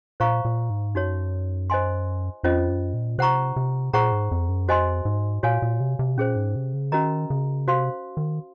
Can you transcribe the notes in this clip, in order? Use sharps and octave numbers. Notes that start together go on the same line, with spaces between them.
A#2 C5 F5 A#5 C#6
A#2
G#2
F#2 D#4 F#4 C#5
C5 D#5 G#5 C6
F2 C#4 F4 C5 D#5
F#2
A#2
C3 C5 F#5 A#5 C#6
C3
A#2 G#4 C5 F#5 A#5 C#6
G#2
F2
F#2
F2 F#4 C5 D#5 G#5 C6
G#2
A#2 F#4 C#5 F5 G#5
A#2
C3
C3
A#2 C#4 G#4 C5
G#2
C3
C#3
D#3 C#4 F#4 A#4 D#5 A#5
C#3
C3 F#4 C5 F5 C6
D#3